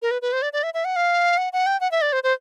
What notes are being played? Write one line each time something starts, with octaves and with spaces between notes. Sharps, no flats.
A#4
B4
B4
C5
D5
D5
E5
E5
F#5
F5
F#5
F#5
G5
F#5
E5
D5
C5
C5